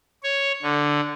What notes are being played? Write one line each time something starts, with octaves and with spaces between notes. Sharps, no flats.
C#5
D3